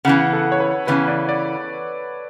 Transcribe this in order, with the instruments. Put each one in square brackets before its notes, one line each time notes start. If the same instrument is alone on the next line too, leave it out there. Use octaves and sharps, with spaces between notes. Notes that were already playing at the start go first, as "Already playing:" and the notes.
[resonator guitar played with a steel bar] C#3 E3 B3 [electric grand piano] F#5
[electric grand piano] A4
C#5
B4
[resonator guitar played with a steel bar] C#3 E3 B3 [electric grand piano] B4
[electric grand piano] D5
D5